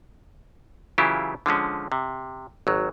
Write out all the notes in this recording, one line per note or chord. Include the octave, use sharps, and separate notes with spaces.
C#3 E3 F#3 E4 F4 G4
D3 F3 G#3 C#4
C3
G#1 F#3